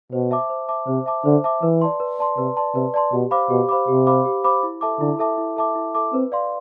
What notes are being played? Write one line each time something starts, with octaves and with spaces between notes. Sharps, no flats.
B2 C5
E5 A5 D6
C5
E5 A5 D6
C3 C5
E5 A5 D6
D3 C5
E5 A5 D6
E3 B4
D5 A5 C6
B4
D5 A5 C6
C3 B4
D5 A5 C6
C3 B4
D5 A5 C6
B2 G4
C5 F5 B5 D6
B2 G4
C5 F5 B5 D6
C3 G4
C5 F5 B5 D6
G4
C5 F5 B5 D6
E4
A4 E5 A5 D6
D3 E4
A4 E5 A5 D6
E4
A4 E5 A5 D6
E4
A4 E5 A5 D6
C4 B4
D5 F5 C6